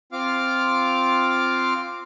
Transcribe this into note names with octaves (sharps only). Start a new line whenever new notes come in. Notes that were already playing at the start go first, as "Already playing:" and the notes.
C4 F4 F5 D6 F6